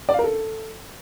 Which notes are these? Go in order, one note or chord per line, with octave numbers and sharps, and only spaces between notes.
D5
F5
A#4
A4